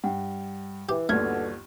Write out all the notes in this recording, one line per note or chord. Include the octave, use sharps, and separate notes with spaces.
G2 F#5 G5
E3 G4
G1 D#2 B2 D3 A3 F6 G#6